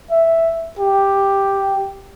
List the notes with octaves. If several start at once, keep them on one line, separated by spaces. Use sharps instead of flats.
E5
G4